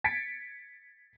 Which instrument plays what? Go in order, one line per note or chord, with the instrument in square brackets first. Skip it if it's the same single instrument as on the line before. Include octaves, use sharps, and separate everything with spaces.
[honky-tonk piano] G#6 A6 B6 C#7 D7